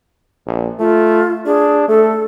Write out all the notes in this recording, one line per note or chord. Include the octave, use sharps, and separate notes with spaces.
A#1
A3 F4
D4 G#4
A3 A4